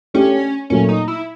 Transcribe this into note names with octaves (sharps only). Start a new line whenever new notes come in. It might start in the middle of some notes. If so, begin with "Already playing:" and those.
A3 C#4 D4 G4
A#2 F#3 A3 C#4
D#4
E4